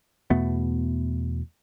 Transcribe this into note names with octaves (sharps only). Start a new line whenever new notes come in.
E2 B2 A3 B3